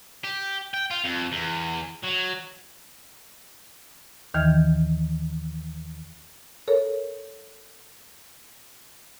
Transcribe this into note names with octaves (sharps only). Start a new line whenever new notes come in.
G4
G5
F4
F2
E2
F#3
D#2 D#3 E3 F6 G6 G#6
A4 A#4 C#5